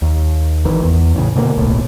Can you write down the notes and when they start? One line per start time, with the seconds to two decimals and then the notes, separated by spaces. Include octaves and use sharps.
0.02 D#2
0.65 G#1 D#3 E3
0.83 E2
1.15 A1 C#3
1.35 B2 D3 F3 A#3
1.57 D1 B1 A2